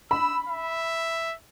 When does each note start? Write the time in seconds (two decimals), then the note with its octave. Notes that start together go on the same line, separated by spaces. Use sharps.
0.11 B5 E6
0.48 E5